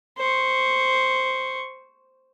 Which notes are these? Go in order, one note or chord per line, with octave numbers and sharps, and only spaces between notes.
C5 C#6